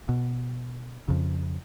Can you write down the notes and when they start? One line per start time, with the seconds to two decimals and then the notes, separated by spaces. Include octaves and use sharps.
0.09 B2
1.08 F2 C#3